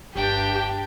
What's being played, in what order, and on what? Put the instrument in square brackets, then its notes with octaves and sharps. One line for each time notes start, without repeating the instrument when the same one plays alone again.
[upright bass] G1 [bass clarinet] G2 [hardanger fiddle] D4 G5 [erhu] G4